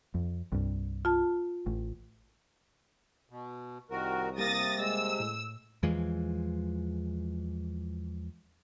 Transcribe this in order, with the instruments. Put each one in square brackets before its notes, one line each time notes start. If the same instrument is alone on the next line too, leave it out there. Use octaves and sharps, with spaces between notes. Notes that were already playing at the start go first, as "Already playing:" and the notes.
[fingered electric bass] F2
C2 G2
[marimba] F4 A5
[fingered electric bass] A1
[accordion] B2
[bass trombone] C2 [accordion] D#3 F#4 A#4
[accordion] C3 [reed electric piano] G3 A#3 F5 [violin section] D#6 A6 A#6
[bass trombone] G#3 [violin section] E6
[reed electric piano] A2
[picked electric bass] E2 E3 F3 G#3